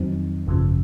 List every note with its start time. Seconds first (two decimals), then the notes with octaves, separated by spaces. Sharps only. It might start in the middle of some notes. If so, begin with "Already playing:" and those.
Already playing: F2 D#3 F#3 C4 D#4
0.47 G#1 F#2 C#3 F3